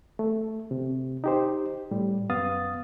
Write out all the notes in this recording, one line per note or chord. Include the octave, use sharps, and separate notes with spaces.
A3
C3
D#4 G4 C5
A2 G3
F#2 B3 F5 D#6 A6